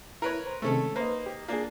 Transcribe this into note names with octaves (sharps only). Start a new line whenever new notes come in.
E4 A#4 B4 C#5
C5 A#5
C3 D#3 G#3 A3 C#4 A4
A#3 D#4 B4 C5
G4
A#3 D4 F4 G#4